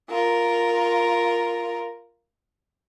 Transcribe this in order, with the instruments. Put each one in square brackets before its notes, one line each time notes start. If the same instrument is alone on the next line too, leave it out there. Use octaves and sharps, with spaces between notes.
[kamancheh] F4 A#4